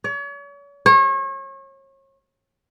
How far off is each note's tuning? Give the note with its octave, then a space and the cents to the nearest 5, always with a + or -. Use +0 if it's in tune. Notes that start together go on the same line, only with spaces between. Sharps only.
C#5 +40
C#5 -35